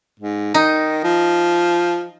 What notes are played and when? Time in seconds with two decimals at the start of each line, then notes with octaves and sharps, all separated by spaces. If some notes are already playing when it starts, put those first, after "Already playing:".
0.20 G#2
0.54 D#3 D#4
1.04 F3